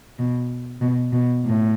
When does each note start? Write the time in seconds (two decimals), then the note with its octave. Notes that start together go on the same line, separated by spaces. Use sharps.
0.19 B2
0.81 B2
1.12 B2
1.44 A2